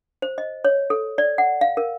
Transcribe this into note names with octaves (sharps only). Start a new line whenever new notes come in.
C5
D#5
C#5
A4
D5
F#5
F5
A#4